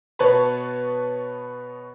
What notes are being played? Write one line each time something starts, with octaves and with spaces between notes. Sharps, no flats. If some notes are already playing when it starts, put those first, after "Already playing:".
B2 B3 B4 C#5 A5 B5